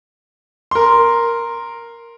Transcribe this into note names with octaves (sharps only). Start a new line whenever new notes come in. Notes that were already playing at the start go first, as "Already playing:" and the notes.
A#4 C6